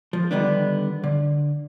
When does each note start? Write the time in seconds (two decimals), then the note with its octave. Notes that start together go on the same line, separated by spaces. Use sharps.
0.13 F3
0.31 D3 D#3 G3 B3 D4
1.04 D3